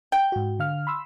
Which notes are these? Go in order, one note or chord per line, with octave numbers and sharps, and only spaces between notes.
G5
G#2 F#4
D3 F5 F6
B5 C6 E6